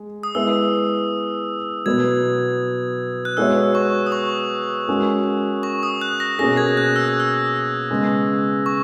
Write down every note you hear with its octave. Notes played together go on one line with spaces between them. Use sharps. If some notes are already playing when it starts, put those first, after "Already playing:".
Already playing: G#3
D#6
G#3 B3 E4 B4 E5 E6
B2 F#3 B3 G#6
F#6
G#3 B3 F#4 C#5 E5 E6
C#6
D#6
C#6
G#3 C#4 F#4 A#4
C#6
D#6
F#6
A#6
B2 A#3 C#4 G#4 A#6
G#6
G#6
F#6
E6
F#6
E6
C#3 G#3 B3
C#6